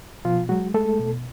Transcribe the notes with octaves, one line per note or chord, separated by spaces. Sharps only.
B2 F3 F4
F#3 G#3 F#4
G#3 A3 A4
B2